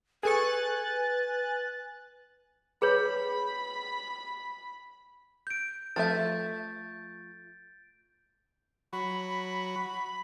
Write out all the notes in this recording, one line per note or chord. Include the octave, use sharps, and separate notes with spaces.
G#4 A4 B4 G#5 C#6 F#6 A6
G#4 B4 C#5 B5
G6 D7
F3 A3 E5 G6 A6
F#3 F#4 B5